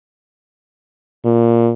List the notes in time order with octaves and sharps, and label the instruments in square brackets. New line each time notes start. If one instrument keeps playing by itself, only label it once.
[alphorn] A#2